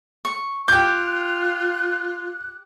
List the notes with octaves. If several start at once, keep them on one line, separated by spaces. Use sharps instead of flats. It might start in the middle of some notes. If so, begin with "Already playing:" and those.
C#6
F4 G4 D6 F#6 G6